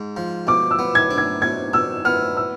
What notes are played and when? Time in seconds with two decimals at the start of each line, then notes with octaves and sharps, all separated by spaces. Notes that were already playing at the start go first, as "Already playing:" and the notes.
Already playing: G#2
0.17 F3
0.47 B2 D6
0.71 E6
0.79 B3
0.95 G#6
1.11 D4
1.18 G#6
1.42 B2 G#6
1.73 B2 E6
2.05 B3 F6
2.37 E6